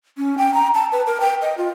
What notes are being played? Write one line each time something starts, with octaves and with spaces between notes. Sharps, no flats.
C#4
G5
A#5
A5
B4
A#4
G5
D#5
F4